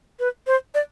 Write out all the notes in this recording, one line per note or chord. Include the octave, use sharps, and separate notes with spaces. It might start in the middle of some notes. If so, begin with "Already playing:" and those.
B4
C5
D5